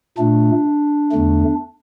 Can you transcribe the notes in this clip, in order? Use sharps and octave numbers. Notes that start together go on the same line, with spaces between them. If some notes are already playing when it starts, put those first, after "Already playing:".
A#2 A3 D4
E2 D3 A3